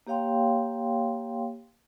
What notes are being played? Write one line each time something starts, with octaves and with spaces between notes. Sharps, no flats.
A#3 G4 C#5 F5 G5 C6